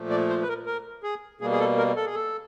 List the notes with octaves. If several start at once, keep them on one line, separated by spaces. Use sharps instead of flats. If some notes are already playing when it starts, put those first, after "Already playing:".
Already playing: A#2 F3 A3
D5
C5
B4
A#4
A#4
G#4
B2 G3 A#3 G#4
G#4
A4
A#4
A4
G#4
A4